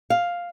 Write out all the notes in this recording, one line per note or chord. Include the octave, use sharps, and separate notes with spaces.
F5